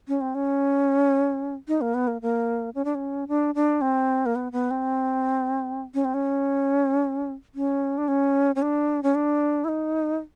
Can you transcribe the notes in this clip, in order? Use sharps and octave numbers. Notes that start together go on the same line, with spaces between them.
C#4
C4
C#4
D#4
A#3
B3
A#3
A#3
C#4
D4
C#4
D4
D4
C4
A#3
B3
B3
C4
C#4
C4
C#4
C#4
D4
C#4
C#4
D4
C#4
D4
E4
D#4